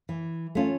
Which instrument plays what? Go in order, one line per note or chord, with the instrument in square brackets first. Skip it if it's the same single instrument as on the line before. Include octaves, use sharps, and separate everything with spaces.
[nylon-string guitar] E3
A3 C#4 F4